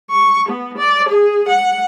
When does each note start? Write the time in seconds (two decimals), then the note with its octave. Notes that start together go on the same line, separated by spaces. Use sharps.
0.10 C#6
0.49 B3
0.78 D5
1.08 G#4
1.48 F#5